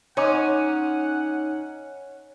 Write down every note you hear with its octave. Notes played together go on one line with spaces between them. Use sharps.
C#4 D#4 C#5 F#5 G#5 C6 D6